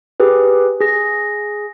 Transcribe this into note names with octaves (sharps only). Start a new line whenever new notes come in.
G4 G#4 B4
G#4 A#6